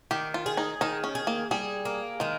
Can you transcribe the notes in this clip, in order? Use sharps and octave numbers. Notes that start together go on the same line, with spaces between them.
D#3 G4
F4
G#4
D#4
D#3 D#4
C#4
G#4
A#3
G3 G#4
A#3
D#3 G#3